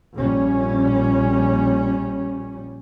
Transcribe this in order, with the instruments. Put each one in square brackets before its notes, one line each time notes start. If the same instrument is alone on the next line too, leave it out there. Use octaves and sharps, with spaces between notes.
[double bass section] A#1 G3 C#4